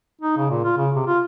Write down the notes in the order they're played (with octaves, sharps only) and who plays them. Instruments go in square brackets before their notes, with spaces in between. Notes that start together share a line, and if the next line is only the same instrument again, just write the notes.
[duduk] D#4
C#3
A#2
F4
C#3
C3
F4